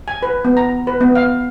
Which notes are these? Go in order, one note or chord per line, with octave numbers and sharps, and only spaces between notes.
G#5
B4
B3
A#5
B4
B3
F5